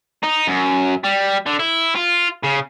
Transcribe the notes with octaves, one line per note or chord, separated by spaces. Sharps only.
D#4
F#2
G3
D3
E4
F4
C#3